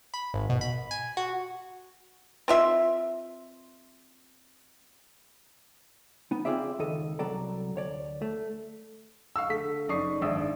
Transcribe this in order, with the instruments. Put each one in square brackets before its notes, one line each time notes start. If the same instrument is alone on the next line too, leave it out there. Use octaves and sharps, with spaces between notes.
[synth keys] B5
G#1
B2
B5
G#5
F#4
[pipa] C4 F4 E5
[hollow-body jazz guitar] B3 D#4
C4 C#4 F4 G#4 D5 E5
C#2 D#3 A4 D#5
C2 F#3 B3 A4 D5 A#5
D2 C#5 D5
A3
[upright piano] F5 C#6 E6
D3 A3 B6
F#1 D#4 D5 C#6 D#6 C7
G#1 D4 E5 D#6 E6